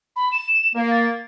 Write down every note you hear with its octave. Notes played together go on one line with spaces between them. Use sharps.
B5
E7
A#3
A6